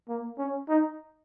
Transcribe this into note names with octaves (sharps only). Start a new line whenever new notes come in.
A#3
C#4
D#4